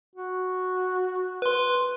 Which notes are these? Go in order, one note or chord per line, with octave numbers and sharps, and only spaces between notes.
F#4
B4 C6